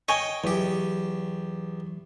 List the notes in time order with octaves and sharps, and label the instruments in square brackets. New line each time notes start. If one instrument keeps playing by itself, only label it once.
[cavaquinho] C#5 G#5 [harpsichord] D#5 G5
[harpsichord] E2 G4 [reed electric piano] E3 F#3